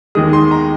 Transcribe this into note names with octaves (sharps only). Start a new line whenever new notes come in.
D#2 D#3 G#3 D#6
C6
A#5